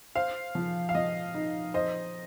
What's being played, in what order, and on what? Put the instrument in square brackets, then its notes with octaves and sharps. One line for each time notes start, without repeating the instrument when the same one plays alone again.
[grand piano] C5 [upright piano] F5
[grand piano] F3
[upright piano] F5
[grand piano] F3 [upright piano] D#5
[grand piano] D#4
[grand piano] C5 [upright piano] D#5